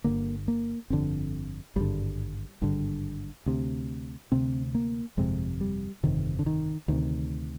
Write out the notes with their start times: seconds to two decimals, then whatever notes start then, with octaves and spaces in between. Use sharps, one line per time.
0.04 G1 F2 D3 A#3
0.48 A#3
0.90 G1 F2 D3 C4
1.76 G#1 G2 D3 G3
2.61 G#1 G2 D3
3.46 D2 C3
4.32 D2 C3 C4
4.75 A#3
5.17 G1 F2 C3 G#3
5.61 G3
6.03 G1 F2 C3 D#3
6.39 D3
6.46 D#3
6.88 D2 C3 D#3